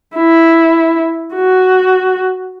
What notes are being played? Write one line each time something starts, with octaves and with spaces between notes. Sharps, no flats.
E4
F#4